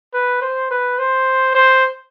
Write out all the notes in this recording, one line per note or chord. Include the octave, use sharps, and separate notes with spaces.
B4
C5
B4
C5
C5